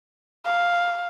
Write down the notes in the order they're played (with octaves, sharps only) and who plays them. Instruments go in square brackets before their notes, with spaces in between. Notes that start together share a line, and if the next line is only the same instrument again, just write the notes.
[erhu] F5